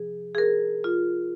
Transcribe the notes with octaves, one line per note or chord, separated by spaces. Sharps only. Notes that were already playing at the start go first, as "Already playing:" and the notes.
Already playing: C3 F3 G#4
G#4
A#4
F4